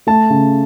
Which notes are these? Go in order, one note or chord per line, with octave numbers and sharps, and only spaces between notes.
A3 A5
C#3